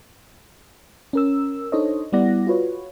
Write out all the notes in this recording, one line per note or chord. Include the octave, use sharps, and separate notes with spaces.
C#4 A#4 E6
D4 D#4 A4 C5 C#5 D#5
G3 B3 E4 D5 F#5 A#6
F4 F#4 B4 C#5